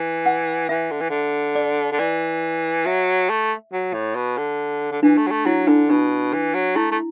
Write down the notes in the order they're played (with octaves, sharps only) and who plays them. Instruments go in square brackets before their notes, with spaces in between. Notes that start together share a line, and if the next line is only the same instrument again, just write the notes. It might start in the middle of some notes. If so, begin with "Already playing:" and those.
Already playing: [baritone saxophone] E3
[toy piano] F#5
[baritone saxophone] E3 [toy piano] E5
[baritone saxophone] D3
E3
D3
[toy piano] D5
[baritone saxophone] D3
[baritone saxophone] E3 [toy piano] D5
[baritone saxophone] F#3 [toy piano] E5
[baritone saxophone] A3
F#3
A2
B2
D3
D3
[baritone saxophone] E3 [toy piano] D4
[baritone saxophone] A3
F#3
A3
[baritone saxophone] F#3 [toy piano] E4
[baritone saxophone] D3 [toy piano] D4
[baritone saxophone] B2 [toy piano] D4
[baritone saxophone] E3
F#3
[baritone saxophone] A3 [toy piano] E4
[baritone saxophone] A3